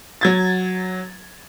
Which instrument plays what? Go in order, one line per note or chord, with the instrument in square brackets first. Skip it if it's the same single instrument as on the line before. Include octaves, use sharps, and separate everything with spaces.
[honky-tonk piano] F#3 G#6 A6